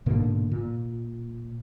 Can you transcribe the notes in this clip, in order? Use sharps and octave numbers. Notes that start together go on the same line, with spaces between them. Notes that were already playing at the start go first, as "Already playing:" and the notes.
G#2 B2 D3 A#3
A#2